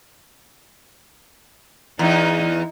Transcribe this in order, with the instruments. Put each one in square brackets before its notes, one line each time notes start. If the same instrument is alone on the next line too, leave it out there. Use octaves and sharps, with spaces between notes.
[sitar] E2 [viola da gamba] D#4